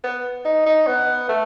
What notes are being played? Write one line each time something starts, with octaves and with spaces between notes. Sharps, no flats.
B3
D#4
D#4
B3
A3